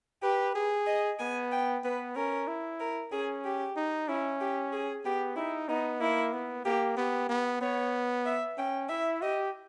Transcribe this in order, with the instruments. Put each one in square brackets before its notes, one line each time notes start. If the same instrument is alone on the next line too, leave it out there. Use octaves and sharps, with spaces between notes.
[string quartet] G4 [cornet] B4
[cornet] G#4
[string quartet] D#5
[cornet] B3 [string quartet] G#5
[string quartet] G5
[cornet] B3 [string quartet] B4
[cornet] C#4 [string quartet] A#4
[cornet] E4
[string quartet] A#4
[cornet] C#4 [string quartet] G#4
[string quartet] G4
[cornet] D#4
[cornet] C#4 [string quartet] E4
[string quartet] G4
G#4
[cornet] B3 [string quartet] G4
[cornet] D#4 [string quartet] E4
[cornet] B3 [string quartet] D#4
[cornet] A#3 [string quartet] E4
[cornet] B3
[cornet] A#3 [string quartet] G4
[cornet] B3 [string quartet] G4
[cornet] B3
[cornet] B3 [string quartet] C#5
[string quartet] E5
[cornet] C#4 [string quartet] G5
[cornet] E4 [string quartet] E5
[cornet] G4 [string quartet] D#5